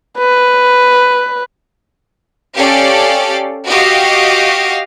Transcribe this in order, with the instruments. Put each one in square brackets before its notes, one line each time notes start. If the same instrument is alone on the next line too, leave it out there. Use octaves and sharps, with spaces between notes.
[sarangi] B4
[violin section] C#4 G4 A4 D5 F5
F#4 G4 D#5 F5